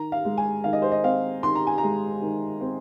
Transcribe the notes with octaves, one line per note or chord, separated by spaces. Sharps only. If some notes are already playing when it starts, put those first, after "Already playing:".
Already playing: D#3 A#5
F5
G#3
G#5
D#3 F5
D#5
C5
D#5
C4 F5
D#3 C6
A#5
G#5
A#5
G#3
D#3
C4